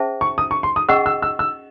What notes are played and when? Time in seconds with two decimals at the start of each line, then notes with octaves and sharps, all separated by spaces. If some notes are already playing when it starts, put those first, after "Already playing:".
Already playing: C#4 G#4 C5 E5 A5
0.21 C#6
0.38 D#6
0.51 C#6
0.63 C6
0.76 D#6
0.88 C#4 G#4 D#5 F#5 C#6 E6
1.06 E6
1.22 E6
1.39 E6